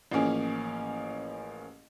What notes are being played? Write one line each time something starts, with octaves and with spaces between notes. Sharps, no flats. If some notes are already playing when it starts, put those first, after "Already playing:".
A1 F3 A#3 C#4 G#4